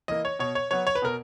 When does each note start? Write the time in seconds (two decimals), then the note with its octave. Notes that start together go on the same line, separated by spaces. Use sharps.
0.08 E3 A#3 D#5
0.25 C#5
0.39 B2 C#5
0.55 C#5
0.71 F#3 B3 C#5
0.87 C#5
0.95 B4
1.02 B2 A#4